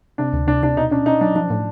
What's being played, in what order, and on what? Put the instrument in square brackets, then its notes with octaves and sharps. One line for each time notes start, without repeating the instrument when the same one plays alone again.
[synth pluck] C3 [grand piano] D4
[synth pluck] D2
[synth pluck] C3 [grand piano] D4
[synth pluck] C3 [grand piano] D4
[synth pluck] B2 [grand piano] D#4
[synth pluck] C#4 [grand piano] D4
[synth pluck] C#4 [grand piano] D#4
[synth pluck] F#3 [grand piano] D4
[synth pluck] F3 [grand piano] D4
[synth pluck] A2